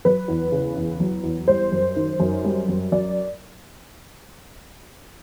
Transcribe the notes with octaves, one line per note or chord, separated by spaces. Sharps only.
F#3 B4
E2
C#3
E2
F#3
E2
G3 C5
F#2
D#3
F#2
G3
F#2
F#3 D5